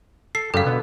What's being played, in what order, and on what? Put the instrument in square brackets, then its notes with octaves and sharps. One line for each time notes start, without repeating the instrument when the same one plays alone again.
[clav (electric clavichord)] A4 [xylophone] C7
[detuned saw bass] F#2 [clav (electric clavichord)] C#3 F#3 G3 [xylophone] A4 F5
[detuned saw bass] B2 [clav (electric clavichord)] D3 B3